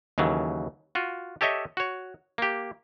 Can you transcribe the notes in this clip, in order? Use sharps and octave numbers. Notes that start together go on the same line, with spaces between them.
D#2 C#3 E3 F#3
F4 F#4
G4 A4 C#5 D#5 E5
F#4 C#5
A#3 G4